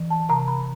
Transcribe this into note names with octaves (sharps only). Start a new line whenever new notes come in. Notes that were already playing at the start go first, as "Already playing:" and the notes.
Already playing: E3
A5
C3 A#5
B5